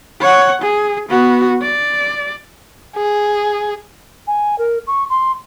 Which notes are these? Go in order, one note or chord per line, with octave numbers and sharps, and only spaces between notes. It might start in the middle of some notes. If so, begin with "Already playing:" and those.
C#5 F#5
G#4
B3 F#4
D5
G#4
G#5
A#4
C#6
C6